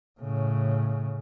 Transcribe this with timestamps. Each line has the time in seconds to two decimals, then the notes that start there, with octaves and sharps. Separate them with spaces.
0.21 A2 C#3